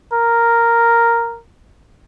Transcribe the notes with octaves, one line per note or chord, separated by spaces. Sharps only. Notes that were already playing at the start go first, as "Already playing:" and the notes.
A#4